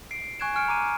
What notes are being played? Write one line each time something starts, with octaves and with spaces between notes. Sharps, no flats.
C7 D7
G#5 C#6 F#6 G#6 D7 E7
G#5 C#6 F6 C#7 D7
A#5 D6 D#7